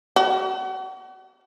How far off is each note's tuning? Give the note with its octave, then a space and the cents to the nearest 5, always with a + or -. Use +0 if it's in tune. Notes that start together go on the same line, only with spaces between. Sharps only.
F#4 +35